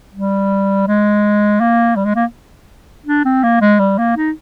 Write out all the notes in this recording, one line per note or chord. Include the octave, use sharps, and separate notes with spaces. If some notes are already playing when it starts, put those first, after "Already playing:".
G3
G#3
A#3
G3
G#3
A#3
D4
C4
A#3
G#3
G3
A#3
D#4